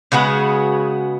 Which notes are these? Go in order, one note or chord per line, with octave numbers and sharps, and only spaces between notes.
C#3 G#3 B3 F#4